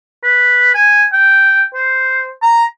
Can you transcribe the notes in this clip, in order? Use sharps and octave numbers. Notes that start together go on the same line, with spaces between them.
B4
G#5
G5
C5
A#5